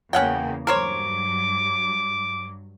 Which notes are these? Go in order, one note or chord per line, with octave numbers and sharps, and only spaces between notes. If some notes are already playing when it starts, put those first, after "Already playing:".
E2 C#3 A#3 C#4 F#5 G5
G2 F#3 A#4 C5 C#5 D6